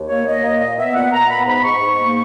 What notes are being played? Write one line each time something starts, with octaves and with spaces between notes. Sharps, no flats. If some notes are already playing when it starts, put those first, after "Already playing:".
Already playing: D#2
A#3 C#5
A#3 D#5
A#3
A#2
B3 E5
A#2 F#5
A#2 A#5
B3 B5
G#2 B5
G#2 C#6
G#2
A#3